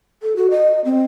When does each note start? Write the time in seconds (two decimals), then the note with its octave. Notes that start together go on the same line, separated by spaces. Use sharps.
0.23 A4
0.36 F#4
0.50 D#5
0.85 C4